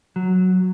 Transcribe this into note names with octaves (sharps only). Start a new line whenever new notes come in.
F#3